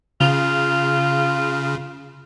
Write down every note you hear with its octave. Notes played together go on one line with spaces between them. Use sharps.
C#3 F4